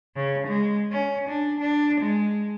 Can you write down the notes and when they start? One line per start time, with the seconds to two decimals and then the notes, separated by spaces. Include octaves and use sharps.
0.16 C#3
0.47 G#3
0.91 C#4
1.29 D4
1.60 D4
2.01 G#3